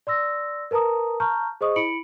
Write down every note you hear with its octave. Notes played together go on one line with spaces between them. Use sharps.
D5 C6 E6 A#6
A#4 B4 A5 A#5 D#6
A5 A#5 C#6 F6 G6
G#4 C5 D#5 C#6 D#6
E4 B5 C#7 D7 F#7